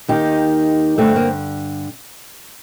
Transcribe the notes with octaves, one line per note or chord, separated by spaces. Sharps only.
D#2 D#3 D#4 G4
G2 D3 A3 C4
A#3